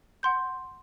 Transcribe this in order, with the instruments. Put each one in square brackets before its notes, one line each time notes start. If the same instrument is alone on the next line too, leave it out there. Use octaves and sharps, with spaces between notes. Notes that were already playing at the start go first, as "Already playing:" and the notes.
[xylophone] F#5 C6 G6